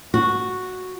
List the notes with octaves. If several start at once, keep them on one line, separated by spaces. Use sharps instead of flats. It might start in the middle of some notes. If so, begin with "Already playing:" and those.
F#4